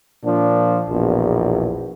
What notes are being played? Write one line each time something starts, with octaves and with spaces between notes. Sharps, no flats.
A#2 F3 D4
A#1 E2 B2